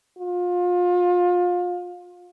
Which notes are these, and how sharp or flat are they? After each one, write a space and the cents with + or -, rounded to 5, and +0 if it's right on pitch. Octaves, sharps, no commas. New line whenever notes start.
F4 +30